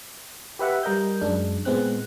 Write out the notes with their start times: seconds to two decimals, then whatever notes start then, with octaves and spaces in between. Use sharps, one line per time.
0.59 G4 B4 E5 F#5 B5
0.83 G3 A#4 D#5 G6
1.21 F#2 G#3 D4
1.65 A#2 G#3 B3 C4 F#6